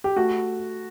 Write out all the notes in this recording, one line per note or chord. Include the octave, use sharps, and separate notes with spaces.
G4
A3 F#4